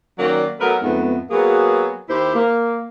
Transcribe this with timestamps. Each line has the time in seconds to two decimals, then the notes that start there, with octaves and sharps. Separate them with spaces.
0.19 D#3 F#3 A#3 C#4 D5
0.60 F#3 A3 B3 A#4 B4 F#5
0.82 F2 G#2 A3 B3
1.30 F#3 A#3 B3 F#4 G#4
2.08 D#2 E4 G4 C5
2.35 A#3